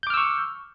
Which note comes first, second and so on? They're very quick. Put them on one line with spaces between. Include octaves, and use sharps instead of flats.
G6 D6 F6 E6 C#6